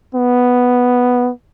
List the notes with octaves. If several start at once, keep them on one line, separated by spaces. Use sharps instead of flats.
B3